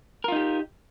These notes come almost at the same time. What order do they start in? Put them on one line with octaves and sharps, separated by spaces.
A#4 F4 D#4 G4